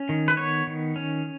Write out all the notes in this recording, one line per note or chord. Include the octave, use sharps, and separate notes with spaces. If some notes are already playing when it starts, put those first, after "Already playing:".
Already playing: C#4
D#3
B4
B3 C#5
D#3
C#4